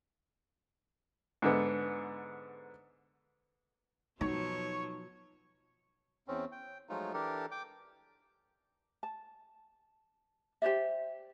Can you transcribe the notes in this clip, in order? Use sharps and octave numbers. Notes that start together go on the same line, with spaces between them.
G#2 D3 B3
B2 F3 F#3 D#4 C#5 C#6
E2 C4 C#4
G5
F3 F#3 G#3 A3 D#4 F4
E3 D4 G4 A4 A#4
G5 D6
A5
G4 C5 D5 E5